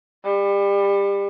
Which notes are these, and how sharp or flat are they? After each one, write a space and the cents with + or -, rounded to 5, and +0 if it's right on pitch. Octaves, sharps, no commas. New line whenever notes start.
G3 +30